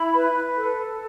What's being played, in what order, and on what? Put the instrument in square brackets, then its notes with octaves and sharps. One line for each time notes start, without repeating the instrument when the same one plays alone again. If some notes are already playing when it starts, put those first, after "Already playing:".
Already playing: [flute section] E4 B5
B4
A4